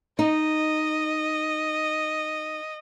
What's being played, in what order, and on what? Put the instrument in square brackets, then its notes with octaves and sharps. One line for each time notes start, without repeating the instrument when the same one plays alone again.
[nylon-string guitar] D#4 [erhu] D#5